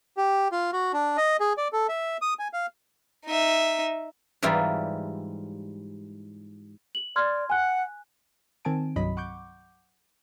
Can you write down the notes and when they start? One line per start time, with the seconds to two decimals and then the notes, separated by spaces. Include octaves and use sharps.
0.17 G4
0.52 F4
0.73 F#4
0.93 D4
1.17 D#5
1.40 G#4
1.58 D5
1.73 A4
1.89 E5
2.22 D#6
2.39 G#5
2.53 F5
3.25 D#4 E5
4.43 G#2 E3 G3 E4 F4
6.95 F#7
7.16 D5 C6 F6 G#6
7.50 F#5 G#5 F#6
8.65 D#3 C4 G#5 A5 D7
8.96 C2 G2 F#3 D#5 B5
9.17 F#5 C#6 D6 G6